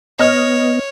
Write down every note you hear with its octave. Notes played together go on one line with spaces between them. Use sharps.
B3 C#5 D#5 F6